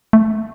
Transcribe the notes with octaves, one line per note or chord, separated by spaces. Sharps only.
A3